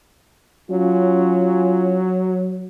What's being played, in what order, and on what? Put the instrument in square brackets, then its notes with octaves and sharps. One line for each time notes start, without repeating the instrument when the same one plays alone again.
[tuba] F#3 [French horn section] C#4 F4